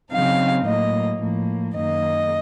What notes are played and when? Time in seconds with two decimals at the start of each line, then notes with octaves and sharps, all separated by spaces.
0.11 C#3 F#3 C4 D#4 F5
0.66 A2 F#3 A#3 D#5
1.21 A2 F3 A#3
1.76 F#2 D#3 A#3 D#5